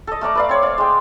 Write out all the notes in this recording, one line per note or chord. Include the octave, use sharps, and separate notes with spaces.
A4 D#5
A3 A#4 D5 A#5
B4 D5 F5
C4 C#5
D5 F5
G#3 G5